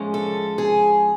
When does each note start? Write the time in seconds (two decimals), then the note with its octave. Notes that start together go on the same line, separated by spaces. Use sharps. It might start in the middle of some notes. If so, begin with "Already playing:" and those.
Already playing: A2 F3 G#3 C#4
0.14 A4
0.58 G#4